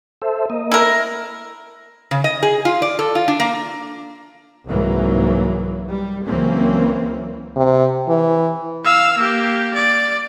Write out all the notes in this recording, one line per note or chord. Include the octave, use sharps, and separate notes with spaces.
A4 C5 E5
A#3 D#5
E4 A#4
C#3
D#5
G#4
F4
D5
A4
F4
D4
A#3
C2 G#2 E3 F#3 A#3
G3
C#2 E3 F#3 A#3 C4 C#4
C3
E3
F5 E6
A#3 G4
D5